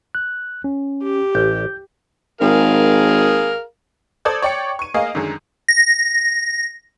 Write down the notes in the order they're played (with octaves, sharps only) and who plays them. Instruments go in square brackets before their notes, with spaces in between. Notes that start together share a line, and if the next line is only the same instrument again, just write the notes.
[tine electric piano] F#6
C#4
[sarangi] G4
[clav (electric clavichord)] A1 [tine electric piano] G6
[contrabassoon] G#1 [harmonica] G#4 A#4 F5
[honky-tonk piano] A4 C5 D5 D#6 G#6
C#5 D5 G5 C#6 C#7
C#6 D#7
A#3 G#4 D#5 F5
F#2 D3 D#3 G#3
[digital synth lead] A#6